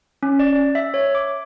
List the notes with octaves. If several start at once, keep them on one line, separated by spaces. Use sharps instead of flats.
C#4
D5
E5
C#5
D6